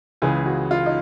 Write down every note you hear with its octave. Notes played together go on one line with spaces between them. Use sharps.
C#2 C#3 E3 G#4
F#4
F4
D#4